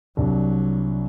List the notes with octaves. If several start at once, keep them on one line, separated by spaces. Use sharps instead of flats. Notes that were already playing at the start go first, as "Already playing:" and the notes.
C2 F#3 D4